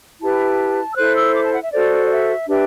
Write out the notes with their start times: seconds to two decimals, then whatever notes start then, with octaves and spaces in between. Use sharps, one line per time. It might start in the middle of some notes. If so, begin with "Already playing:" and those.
0.21 E4 G4 B4 A5
0.92 E6
0.96 E4 A4 C5 F#6
1.16 E6
1.34 D6
1.44 A5
1.53 F#5
1.63 E5
1.72 F#4 A4 C5 D5
2.06 D5
2.09 E5
2.48 D4 G4 B4 E5